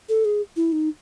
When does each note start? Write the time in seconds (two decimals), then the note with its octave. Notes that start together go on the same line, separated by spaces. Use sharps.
0.09 A4
0.25 G#4
0.56 E4
0.72 D#4